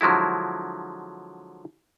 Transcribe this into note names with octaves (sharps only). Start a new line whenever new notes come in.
D3 F3 F#3 G#3 E4